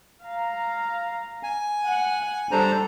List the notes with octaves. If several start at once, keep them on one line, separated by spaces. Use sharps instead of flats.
F5 A#5
G#5
F#5
G3 D4 A4 C5 A#5